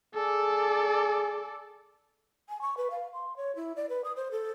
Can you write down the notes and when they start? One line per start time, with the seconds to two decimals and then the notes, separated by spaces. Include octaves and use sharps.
0.15 G#4 A4 D5
2.49 G#5
2.61 C#6
2.77 B4
2.90 F5
3.13 C6
3.36 C#5
3.55 E4
3.76 D5
3.89 B4
4.04 D#6
4.16 C5
4.31 A4